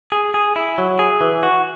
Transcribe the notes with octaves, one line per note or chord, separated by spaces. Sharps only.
G#4
G#4
E4
F#3
G#4
E3
F#4